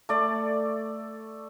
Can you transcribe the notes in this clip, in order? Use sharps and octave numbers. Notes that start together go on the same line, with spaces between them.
A3 D5